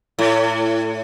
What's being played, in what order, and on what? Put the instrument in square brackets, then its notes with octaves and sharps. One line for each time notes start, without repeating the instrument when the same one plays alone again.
[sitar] A2